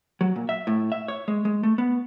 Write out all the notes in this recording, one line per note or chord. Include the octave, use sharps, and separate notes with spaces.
F#3
A#2
E5
A2
E5
C#5
G#3
G#3
A3
B3